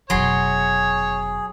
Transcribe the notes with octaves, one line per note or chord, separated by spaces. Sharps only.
F1 B2 F#3 G#4 C#5 C6